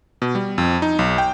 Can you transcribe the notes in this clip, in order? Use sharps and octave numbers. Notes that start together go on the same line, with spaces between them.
B2
G3
F2
D#4
B1
G5